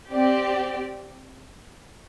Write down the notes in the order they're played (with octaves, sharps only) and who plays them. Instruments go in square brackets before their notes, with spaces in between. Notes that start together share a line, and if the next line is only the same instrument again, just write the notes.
[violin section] C4 G4 D5